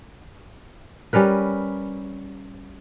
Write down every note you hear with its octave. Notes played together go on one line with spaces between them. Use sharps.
G3 C#4 A#4 B4